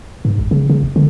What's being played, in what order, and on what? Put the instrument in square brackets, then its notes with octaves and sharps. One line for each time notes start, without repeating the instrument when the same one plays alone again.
[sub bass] G#2
G#1
C#3
C#3
F1
D3